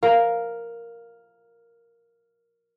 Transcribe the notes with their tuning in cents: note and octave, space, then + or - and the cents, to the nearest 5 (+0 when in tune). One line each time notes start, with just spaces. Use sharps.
A#4 +0 F5 +0